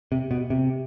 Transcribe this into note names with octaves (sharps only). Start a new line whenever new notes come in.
C3
B2
C3